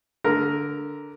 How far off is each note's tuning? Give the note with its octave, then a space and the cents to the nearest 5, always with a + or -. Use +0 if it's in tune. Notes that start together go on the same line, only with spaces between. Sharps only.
D3 -10 A#4 +0